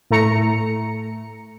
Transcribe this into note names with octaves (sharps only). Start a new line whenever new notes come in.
A2 A3 A#5 C#7